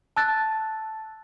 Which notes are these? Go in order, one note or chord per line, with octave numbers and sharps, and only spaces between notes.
A5 E6 F#6 A6